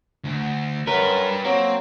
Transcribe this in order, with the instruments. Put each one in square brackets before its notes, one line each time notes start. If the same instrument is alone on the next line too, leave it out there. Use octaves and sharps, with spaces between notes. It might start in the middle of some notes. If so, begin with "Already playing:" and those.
[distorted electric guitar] D2
[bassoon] F#2 [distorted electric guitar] G3 B4 [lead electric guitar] A#4
[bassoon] F#3 [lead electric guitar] A#3 [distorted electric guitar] C4